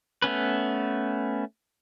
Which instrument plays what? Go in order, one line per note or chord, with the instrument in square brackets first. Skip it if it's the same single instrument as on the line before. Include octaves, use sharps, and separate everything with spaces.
[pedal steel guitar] A3 B3 C#4 B4